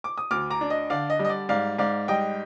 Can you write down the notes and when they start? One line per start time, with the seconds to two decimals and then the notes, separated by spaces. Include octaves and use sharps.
0.04 D6
0.18 D#6
0.31 D2 D6 F6
0.50 A#5 D6
0.61 D4
0.70 D#5
0.90 D3 D5 F5
1.10 D#5
1.19 G3
1.25 D#5
1.30 D5
1.49 G#2 D5 F5
1.78 G#2 D5 F5
2.08 G3 D#5 G5